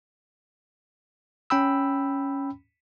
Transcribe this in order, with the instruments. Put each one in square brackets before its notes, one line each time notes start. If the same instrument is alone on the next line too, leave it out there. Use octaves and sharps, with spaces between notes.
[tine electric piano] C#4 G5 B5 E6